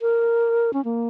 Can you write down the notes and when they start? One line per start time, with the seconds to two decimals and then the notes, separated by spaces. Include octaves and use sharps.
0.01 A#4
0.73 C#4
0.85 A#3